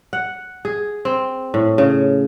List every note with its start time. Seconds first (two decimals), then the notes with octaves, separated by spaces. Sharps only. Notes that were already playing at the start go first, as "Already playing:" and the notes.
0.13 F#5
0.65 G#4
1.05 C4
1.54 A2
1.78 C#3